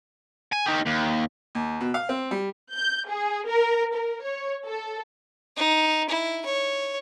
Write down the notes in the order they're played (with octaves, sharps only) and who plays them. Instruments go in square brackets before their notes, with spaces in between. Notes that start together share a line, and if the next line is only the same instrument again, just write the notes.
[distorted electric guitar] G#5
D#4 G4
D#2
[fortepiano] D#2
B2
F5
C4
G3
[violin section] G6
G#4
A#4
A#4
C#5
A4
[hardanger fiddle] D#4
E4
C#5